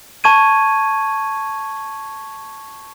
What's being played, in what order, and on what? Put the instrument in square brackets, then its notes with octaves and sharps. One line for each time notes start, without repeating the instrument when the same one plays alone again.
[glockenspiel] A5 C#6 G#6 D#7